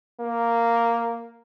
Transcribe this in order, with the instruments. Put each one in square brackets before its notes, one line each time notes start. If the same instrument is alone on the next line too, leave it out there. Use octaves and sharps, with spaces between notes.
[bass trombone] A#3